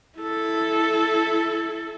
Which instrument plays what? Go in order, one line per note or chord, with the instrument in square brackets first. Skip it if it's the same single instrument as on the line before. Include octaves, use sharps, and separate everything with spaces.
[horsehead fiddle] E4 A4